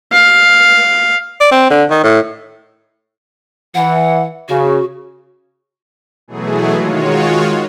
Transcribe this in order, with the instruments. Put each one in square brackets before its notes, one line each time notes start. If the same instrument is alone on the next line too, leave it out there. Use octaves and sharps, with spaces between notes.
[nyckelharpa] F5
[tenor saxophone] D5
C4
D3
D#3
A2
[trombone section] E3 [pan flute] F#5
[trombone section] C#3 [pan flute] F#4
[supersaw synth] B2 E3 F#3 A3 G#4
D#3 G#3 F4 F#4 C#5